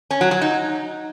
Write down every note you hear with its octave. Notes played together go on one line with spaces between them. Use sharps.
C#4
F#3
F#3
D#4